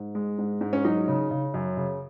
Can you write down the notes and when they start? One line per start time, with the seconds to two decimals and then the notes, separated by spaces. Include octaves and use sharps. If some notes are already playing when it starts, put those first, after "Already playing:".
Already playing: G#2
0.15 G#3
0.38 G#2
0.61 G#2
0.73 C#4
0.85 F#3 D#4
1.08 C#3
1.31 C#3
1.54 F#2
1.77 C#3